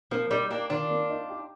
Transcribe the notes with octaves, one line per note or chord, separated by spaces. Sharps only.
F3 A#3
G3 D#4
A#3 D4 G4
D#3 D4 F4
A#3
D#4
G4